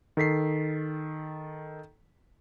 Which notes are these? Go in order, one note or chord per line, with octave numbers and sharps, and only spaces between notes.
D#3 A4 B6 C7